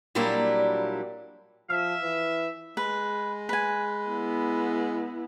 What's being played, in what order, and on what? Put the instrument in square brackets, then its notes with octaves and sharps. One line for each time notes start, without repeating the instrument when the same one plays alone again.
[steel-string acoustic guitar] A#2 F#3 G3 A#3 D4 E4
[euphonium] F3 [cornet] E5 [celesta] F6
[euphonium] E3
[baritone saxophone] G#3 [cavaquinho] B4
[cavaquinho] B4 G#5
[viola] B3 E4